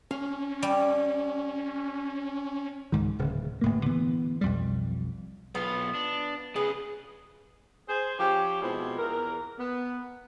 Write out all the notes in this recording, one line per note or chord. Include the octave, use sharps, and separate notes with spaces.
C#4 F5
G3
C#2 G#2 D#3
D1 C#3
G1 A2 A#3
D3 E3 B3
B1 F2 G3
B1 B3 F4
D4
C#3 G#4 B4
G#4 C5
F3 C#4 G4
B2 F3 G#3 C4 E4
E2 A#4
B3